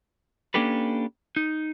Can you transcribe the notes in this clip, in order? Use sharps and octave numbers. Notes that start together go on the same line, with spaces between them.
A#3 C#4 D4 G4 A4 B4
D#4